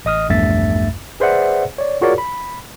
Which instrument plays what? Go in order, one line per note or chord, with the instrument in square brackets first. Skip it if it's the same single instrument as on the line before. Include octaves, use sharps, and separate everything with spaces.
[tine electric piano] A1 D#5 D#6 F6
A#1 E2 G2 A3 E5 A6
G#4 B4 C5 D5 E5 F#5
C#5 D5
F4 F#4 G#4 A#4 C#5 D5
B5